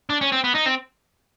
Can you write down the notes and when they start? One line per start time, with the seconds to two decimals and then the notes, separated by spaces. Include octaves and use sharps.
0.10 D4
0.21 C#4
0.32 C4
0.44 B3
0.55 D#4
0.66 C4